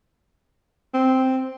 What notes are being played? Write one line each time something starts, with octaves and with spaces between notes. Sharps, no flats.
C4